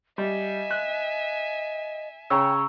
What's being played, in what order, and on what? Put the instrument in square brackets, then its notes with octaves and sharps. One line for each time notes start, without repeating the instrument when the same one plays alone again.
[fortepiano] G3 [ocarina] D#5 [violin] E5 G#5
[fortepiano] F#6
[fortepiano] C#3 C#5 [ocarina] G5 [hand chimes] A#5 C#6 E6